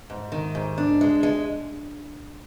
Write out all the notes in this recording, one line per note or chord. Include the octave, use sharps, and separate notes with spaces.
G#2
D#3
G#2
D4
G#3
G#3